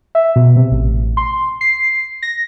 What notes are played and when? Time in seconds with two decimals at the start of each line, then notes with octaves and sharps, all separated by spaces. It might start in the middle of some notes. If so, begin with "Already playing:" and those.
0.15 E5
0.36 B2
0.56 C3
0.71 A1
1.17 C6
1.61 C7
2.22 A#6